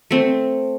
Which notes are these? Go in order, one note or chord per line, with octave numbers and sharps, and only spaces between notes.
A3 C4